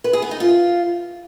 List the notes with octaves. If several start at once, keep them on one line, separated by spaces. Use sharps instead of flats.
B4
G#4
B3
D#4
F4